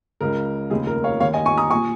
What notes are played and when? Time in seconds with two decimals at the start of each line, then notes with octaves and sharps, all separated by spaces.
0.21 C#2 C#3 A#4
0.70 F1 D#2 C#3 G#4
0.87 A#4
1.04 C#5 F5
1.20 D#2 D#3 C#5 F5
1.34 D#5 G#5
1.46 G#5 C#6
1.57 A#5 D#6
1.70 A#2 G#5 C#6